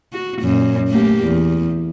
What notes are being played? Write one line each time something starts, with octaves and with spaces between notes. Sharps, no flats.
F#4
F#2 A#2
A3 A#3 G4
E2